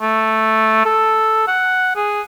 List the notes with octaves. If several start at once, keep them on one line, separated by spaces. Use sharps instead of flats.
A3
A4
F#5
G#4